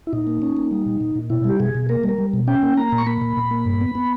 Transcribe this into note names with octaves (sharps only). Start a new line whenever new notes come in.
E4
A#2 D#4
A#3
C#4
A#3
G3
A#2
A#2
A#2
B2 E4
G3 G4
B2 G#4
B2
A#3 A#4
G3
A#4
G3
B2
C#4 G5
A#3
A#3 A#5
A#2
C#6
A#3 B5
A#2
A#2
A#3
G2
B3
B3